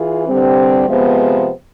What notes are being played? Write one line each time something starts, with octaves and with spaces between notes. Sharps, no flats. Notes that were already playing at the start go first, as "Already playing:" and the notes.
Already playing: E3 F4 G#4
G2 D3 G3 C4
C3 F3 G#3 B3